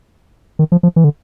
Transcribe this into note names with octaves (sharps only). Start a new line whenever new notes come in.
D#3
F3
F3
E3
D3